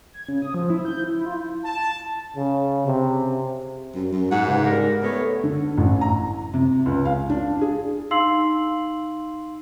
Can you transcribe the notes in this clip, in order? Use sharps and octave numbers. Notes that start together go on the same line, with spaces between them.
G#6
C#3
D#6
F3
E4
G6
E4
F4
A5
C#3
C3
F#2
F#2
G#2 F#5
D2 G2 C#3
G3 A#4
A3 B3 C#5
D3
A1
A#5
C3
C#2
F5
D4
G#4
D#4 F5 C6 E6 C7 F#7